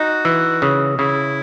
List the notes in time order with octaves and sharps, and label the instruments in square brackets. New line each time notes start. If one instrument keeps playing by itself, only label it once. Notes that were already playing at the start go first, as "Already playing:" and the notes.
Already playing: [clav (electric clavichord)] D#4 [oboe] F#4
[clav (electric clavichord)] E3
C#3
[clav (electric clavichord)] C#3 [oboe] E4